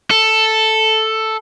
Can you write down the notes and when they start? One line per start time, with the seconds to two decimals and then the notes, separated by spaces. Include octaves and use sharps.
0.11 A4